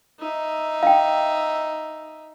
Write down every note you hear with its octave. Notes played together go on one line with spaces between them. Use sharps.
D#4 E5
F5 G5